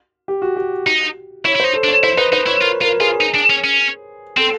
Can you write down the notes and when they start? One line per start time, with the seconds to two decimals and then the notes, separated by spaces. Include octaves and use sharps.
0.28 G4
0.42 F#4
0.56 G4
0.87 D#4
1.45 E4 C#5
1.55 E4
1.60 D#4 C5
1.74 A4
1.83 D4
1.88 C#5
2.03 E4 C5
2.17 D#4 B4
2.33 D#4 C5
2.47 E4 C#5
2.61 F4 A#4
2.81 F4 A#4
3.00 F4 G#4
3.20 D#4
3.35 D4
3.50 C#4
3.64 C#4
4.37 C4 A4